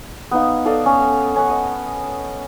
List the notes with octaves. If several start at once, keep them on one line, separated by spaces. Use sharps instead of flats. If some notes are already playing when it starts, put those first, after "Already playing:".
B3 D#4 F5
A4 D5 D#5 F5
C#4
C#4 F#5 C#6
D#5